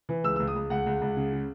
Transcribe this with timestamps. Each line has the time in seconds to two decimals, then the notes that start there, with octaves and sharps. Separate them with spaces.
0.09 E3
0.24 C#2 E6
0.36 E6
0.39 C#2
0.47 D#6
0.56 C#2
0.70 C#2 F#5
0.86 C#2
1.01 C#2
1.17 C#3
1.33 C#3